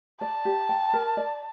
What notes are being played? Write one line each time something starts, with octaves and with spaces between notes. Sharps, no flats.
D5 A5
G4
G5
A#4
D5